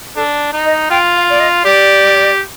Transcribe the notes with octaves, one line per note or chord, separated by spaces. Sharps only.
D4 A4
D#4
D#5
F4 G5
F5
D5
D#5
G4 D5